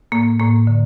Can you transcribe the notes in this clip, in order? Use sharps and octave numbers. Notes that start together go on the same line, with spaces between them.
A2 A#3
A2 A#3
D3